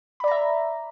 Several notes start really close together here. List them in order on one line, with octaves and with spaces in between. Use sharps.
B5 D5 A#5 E5